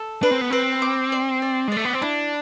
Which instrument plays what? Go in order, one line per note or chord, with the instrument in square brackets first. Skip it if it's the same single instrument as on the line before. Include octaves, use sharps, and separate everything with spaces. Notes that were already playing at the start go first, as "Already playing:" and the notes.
Already playing: [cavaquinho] A4
[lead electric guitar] D4 [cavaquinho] B4
[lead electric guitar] C4
B3
[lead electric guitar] C4 [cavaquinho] B4
[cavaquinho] D6
D5
D5
[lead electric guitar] G#3
[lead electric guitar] A3 [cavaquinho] D5
[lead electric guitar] B3
C4
[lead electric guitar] D4 [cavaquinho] E4